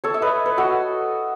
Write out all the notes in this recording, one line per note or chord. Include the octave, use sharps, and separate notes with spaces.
A4 C#5
E5
B4 D#5
B4
F#4 A4